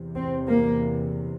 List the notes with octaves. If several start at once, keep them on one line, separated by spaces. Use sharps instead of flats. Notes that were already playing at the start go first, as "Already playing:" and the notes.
Already playing: E2 C3
C4
A#3